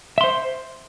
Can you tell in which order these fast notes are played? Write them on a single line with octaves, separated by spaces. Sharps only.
E5 C6 C5